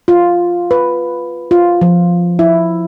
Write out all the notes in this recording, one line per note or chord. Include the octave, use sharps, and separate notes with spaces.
F4
B4
F4
F3
E4